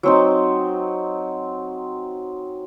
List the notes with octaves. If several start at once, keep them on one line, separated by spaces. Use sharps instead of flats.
F#3 C4 D#4